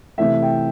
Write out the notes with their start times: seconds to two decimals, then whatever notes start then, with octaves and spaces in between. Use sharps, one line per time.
0.18 C3 E3 A3 E5
0.42 G5